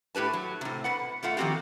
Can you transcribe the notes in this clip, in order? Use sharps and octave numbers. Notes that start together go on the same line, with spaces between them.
A2 G4 B4 A5
F#3
A2 C3
B2 B4 F#5
B2 A3 F4 F#5
D#3 F3 A#3 C4 F#4 G4